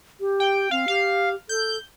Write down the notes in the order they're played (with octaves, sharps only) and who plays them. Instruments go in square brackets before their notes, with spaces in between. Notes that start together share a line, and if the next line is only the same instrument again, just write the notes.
[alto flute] G4
[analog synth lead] G5
[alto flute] C4 [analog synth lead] F5
[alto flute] G4 [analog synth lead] F5
[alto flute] A4 [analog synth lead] G6